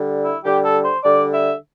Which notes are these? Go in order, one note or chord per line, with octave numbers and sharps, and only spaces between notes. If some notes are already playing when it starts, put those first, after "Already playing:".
Already playing: D3 G3
E4
D3 G3 G4
A4
C5
D3 G3 D5
E5